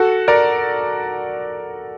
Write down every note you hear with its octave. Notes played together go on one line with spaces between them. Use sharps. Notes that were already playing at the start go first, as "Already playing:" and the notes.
Already playing: F#4 A4
A#4 D5